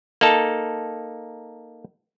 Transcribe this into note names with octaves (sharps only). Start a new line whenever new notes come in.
A#3 D#4 A4 A5